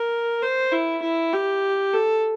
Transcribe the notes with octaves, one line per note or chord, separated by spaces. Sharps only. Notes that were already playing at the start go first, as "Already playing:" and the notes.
Already playing: A#4
C5
E4
E4
G4
A4